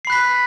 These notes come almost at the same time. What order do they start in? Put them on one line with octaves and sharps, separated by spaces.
C7 B5 F#6 B6